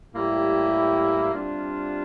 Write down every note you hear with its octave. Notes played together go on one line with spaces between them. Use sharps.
A2 G3 A#3 E4 G4
C3 G3 D4 F4